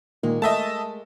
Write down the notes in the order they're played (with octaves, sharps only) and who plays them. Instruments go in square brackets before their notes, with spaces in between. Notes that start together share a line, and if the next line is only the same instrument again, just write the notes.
[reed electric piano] A#2 D#3 [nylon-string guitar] G#3 A#3
[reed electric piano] A3 [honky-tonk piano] D#5 E5 A5